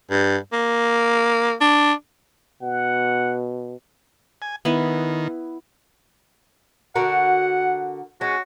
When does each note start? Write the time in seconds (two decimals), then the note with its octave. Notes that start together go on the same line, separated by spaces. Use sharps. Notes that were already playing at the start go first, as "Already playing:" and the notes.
0.10 G2
0.53 A#3
1.61 D4
2.62 B2 F#5
4.42 G#5
4.65 D#3 B3 E4 G#5
6.95 D3 F#4 A#4 F#5
8.21 G#3 C#4 F#4